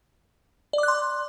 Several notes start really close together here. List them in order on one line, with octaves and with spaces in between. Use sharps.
D5 D6 F#6 C6